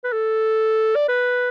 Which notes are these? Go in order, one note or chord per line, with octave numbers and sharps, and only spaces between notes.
B4
A4
D5
B4